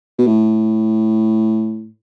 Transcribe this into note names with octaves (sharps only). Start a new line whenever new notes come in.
B2
A2